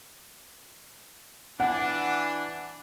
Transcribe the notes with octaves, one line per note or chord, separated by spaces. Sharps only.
E3 D4 F#5